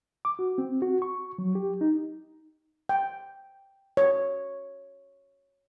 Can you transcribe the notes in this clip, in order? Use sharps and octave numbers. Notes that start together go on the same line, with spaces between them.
D6
F#4
C4
F#4
C#6
F#3
G4
D#4
G5
C#5